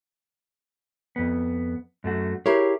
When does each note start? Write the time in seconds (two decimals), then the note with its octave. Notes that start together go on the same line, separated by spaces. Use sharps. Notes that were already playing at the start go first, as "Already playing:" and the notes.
1.16 F2 B3
2.04 F#2 A3 F#4
2.46 E4 G4 G#4 A#4 C#5